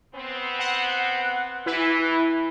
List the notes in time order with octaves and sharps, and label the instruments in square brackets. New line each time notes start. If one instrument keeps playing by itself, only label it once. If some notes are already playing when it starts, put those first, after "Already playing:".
[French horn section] B3 C4
[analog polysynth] F#5
[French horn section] E3 [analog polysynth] E4 B4